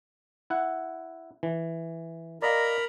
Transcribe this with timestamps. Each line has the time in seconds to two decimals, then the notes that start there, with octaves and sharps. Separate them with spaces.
0.50 E4 F#5
1.43 E3
2.42 A#4 D5 D#5 F5 A#5 B5